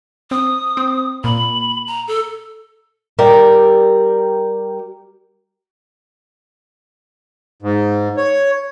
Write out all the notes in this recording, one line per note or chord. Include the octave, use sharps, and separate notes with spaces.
C4 D#6
C4
A#2 B5
A#5
A4
G3 G4 A#4 D5
G#2
C#5